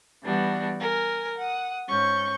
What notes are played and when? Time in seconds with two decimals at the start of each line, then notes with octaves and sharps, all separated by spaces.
0.22 E3 G3 B3 D4 F#4
0.79 A#4 G#5
1.36 F#5 D#6
1.88 G#2 C#4 C#6 G6